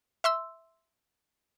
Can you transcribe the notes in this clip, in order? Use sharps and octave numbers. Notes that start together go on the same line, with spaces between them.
E5 C6 E6